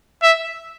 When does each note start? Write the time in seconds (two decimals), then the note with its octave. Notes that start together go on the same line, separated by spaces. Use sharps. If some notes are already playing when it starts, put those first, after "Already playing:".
0.23 E5